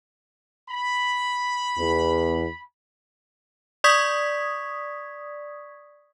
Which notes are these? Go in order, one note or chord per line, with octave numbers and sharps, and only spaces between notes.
B5
E2
D5 C#6 D#6 G#6 B6